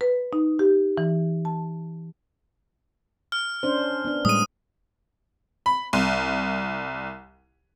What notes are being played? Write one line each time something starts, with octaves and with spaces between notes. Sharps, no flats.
B4
D#4
G4
E3
A5
F6
C#4 D4 C5
B3 D4
A2 G3 G#3 D#6 D#7
B5
C2